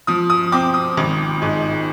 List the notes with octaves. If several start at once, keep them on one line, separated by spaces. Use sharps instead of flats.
F3 D#6
D#6
C4 D6
D#6
G#1
G#2